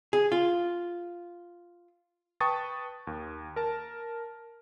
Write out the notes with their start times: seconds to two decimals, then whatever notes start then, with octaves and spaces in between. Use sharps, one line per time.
0.13 G#4
0.32 F4
2.41 B4 G5 A5 C#6 D#6 A6
3.07 D#2
3.56 A#4 A5